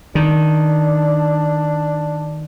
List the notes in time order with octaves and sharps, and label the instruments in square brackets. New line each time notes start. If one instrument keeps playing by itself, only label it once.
[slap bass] D#3 [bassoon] D4